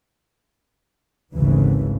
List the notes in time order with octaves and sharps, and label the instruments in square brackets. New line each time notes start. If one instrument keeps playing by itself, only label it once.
[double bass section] G#1 D2 G#2 C#3 E3